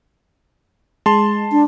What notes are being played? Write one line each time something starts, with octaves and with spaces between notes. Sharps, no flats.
G#3 A5 C6
D4